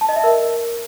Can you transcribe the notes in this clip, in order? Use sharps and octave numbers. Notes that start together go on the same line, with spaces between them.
A5
D#5
E5
A#4